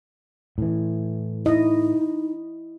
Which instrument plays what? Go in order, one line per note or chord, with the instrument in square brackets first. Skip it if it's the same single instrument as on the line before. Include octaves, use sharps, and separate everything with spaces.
[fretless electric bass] A2 E3
[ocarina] D#4 [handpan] E4 D#5